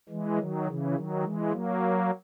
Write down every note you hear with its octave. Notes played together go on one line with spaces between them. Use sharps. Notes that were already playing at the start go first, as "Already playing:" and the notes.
E3 G#3
D#3 F#3
C#3 E3
D#3 F#3
E3 G#3
F#3 A#3